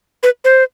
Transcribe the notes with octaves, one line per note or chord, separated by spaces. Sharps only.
B4
C5